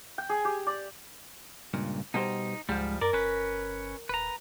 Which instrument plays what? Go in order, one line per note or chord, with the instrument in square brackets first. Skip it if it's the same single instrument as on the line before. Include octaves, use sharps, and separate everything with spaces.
[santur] G5
G#4
G4
D5
[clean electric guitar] C#2 G2 A#2
[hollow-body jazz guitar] B2 G3 C5 [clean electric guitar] D#4
[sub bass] C#2 [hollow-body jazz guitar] G#2 [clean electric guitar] F3 G3
[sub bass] F#2 [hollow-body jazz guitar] A#4 [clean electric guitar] D5
[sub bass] G1 [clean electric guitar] C#4 B4
[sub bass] D#1 [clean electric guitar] B4 A#5